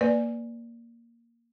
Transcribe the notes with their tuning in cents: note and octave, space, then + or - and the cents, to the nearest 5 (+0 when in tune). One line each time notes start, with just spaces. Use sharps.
A#3 +0 B4 +0 D5 +0